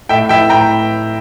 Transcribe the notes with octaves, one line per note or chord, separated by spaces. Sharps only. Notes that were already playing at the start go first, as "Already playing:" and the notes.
A2 E5 G5
E4 E5 G5
A2 G5 A#5